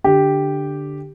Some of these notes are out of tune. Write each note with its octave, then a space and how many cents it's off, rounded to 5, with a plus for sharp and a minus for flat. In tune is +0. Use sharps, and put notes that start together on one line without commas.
D3 +0 G4 +0